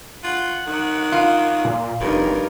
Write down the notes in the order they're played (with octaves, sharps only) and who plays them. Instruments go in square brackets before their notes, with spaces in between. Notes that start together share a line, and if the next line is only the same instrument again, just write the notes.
[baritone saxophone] F4 [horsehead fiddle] F#5
[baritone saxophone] D#3
[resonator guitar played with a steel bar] F4
[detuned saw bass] A#2
[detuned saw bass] F1 [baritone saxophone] G2 [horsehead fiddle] D#4 A#4